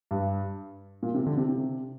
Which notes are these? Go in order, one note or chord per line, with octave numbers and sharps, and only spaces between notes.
G2
A#2
C3
D3
C3
C3